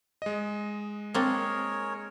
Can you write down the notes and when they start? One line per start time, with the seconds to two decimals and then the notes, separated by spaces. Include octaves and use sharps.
0.22 G#3 D#5
1.14 A#3 C4 D4 G#4 A#4 C#5